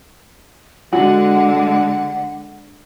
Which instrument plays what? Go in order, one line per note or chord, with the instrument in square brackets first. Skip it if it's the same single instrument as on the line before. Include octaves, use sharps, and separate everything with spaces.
[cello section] D3 G#3 [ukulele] F#4 [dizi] F#5